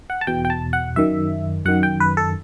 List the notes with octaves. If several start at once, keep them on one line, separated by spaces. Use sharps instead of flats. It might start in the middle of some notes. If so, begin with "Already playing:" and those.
F#5
A5
E2 B2 G5
G5
A5
F#5
F#2 D#3 E5
F#2 D#3 F#5
G5
B4
A4